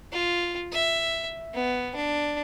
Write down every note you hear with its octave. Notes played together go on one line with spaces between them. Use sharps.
F4
E5
B3
D4